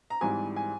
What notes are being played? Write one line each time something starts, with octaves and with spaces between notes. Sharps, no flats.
A#5
G#1 G#2 E3 G3 G#5
G#5